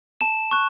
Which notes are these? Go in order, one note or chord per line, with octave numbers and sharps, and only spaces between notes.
A5 E7
C#6 F#6